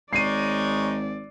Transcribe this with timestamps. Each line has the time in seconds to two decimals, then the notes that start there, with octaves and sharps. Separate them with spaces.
0.13 G#1 G#3 D#4 C#5 D5 C7 D#7